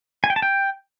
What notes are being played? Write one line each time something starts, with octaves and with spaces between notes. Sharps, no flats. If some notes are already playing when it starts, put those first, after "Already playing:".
G#5
G5
A5
G5